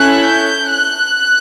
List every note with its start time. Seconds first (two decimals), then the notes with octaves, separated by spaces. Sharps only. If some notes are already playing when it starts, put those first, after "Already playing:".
Already playing: C#4 E4 A4 F#6
0.26 G6
0.69 F#6